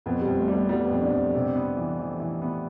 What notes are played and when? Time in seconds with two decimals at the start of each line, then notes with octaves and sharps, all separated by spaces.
0.06 F2 B3
0.21 G3
0.27 F2
0.38 A3
0.48 G3
0.53 B3
0.69 G3 B3
0.86 B3
0.91 F2
1.02 D4
1.12 F2
1.35 C3
1.56 B3
1.77 E3
1.99 E3
2.20 E3
2.42 B3